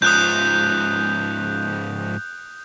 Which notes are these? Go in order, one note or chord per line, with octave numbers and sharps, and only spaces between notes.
G#2 F3 D#6 F#6 G6